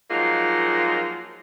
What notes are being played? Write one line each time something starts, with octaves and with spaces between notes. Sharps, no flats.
F3 F#3 G#3 A#3 D#4 F4